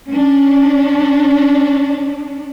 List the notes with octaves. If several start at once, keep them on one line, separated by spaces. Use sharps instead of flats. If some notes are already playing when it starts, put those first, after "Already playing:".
C#4 D4